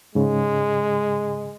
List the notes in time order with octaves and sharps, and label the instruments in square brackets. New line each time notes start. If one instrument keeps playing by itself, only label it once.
[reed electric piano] G#2 C#3 [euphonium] G#3